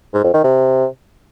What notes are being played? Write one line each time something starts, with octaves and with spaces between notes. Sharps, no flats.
G#2
F2
D#3
C3